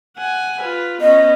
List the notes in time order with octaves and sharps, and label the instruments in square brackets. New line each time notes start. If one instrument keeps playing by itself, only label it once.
[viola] F#5 G#5
F4 B4
[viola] B3 C#4 [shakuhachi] D#5